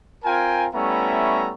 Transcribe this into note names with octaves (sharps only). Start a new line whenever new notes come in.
C4 F4 A#4 G5 G#5
G3 A3 B3 C#4 E4 A#5